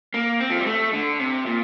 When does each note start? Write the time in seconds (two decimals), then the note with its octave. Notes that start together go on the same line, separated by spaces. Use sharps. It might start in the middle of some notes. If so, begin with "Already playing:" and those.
0.14 A#3
0.40 C4
0.50 F3
0.58 G3
0.66 A3
0.93 D3
1.19 C3
1.46 A#2